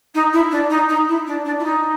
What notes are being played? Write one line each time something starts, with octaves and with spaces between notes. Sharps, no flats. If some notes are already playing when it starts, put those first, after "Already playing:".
D#4
E4
D4
D#4
D#4
E4
D4
D4
E4
D#4